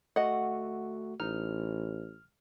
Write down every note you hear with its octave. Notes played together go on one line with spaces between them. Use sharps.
A3 F#4 D#5 F#5
A1 D#4 F6